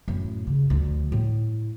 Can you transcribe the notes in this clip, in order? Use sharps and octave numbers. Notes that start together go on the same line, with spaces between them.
F#2 A2
C#3
D2 F3
A2